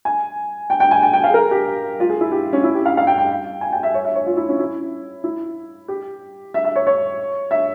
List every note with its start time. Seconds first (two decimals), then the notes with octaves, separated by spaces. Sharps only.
0.05 G#5
0.70 G5
0.80 G5
0.91 G#5
1.03 G5
1.13 G5
1.24 F5
1.30 G#4
1.34 A#4
1.51 G4
2.00 F4
2.10 G#4
2.21 E4
2.32 G4
2.53 C#4
2.64 E4
2.75 G4
2.86 F5
2.97 F5
3.07 G5
3.18 G5
3.61 G#5
3.73 G5
3.83 E5
3.94 C#5
4.05 E5
4.15 C#5
4.26 F4
4.37 E4
4.49 C#4
4.59 E4
5.24 E4
5.88 G4
6.54 E5
6.65 E5
6.76 C#5
6.87 C#5
7.51 E5